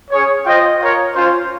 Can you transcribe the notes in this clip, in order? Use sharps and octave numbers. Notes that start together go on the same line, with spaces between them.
C#4 G#4 C#5
F4 C5 D#5 G5
F4 A#4 C#5
C#4 F4 C5